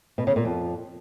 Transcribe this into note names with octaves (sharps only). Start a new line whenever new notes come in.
B2
C#3
A#2
F2